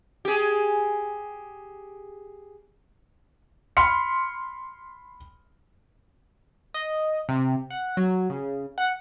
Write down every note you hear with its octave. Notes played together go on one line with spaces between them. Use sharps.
G4 G#4
B5 C6 F6 C#7
D#5
C3
F#5
F#3
C#3
F#5